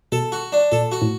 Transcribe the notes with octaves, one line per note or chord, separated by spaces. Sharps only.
B2 A4
F#4
D4
A#2 A4
F#4
A2